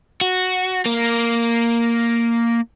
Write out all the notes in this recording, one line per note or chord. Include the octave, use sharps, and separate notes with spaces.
F#4
A#3